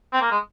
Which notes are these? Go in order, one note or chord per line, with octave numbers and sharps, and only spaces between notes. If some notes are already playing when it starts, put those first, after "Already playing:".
C4
A#3
G#3